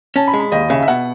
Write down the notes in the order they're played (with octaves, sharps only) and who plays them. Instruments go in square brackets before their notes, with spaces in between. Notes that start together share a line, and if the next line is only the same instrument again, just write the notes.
[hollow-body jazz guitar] C#4 [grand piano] A5
[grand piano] B5
[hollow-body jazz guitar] G#3
[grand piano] B5
[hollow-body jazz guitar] D#2 [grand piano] D#5
[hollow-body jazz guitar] C#3 [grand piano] E5
[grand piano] E5
[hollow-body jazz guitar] B2 [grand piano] F#5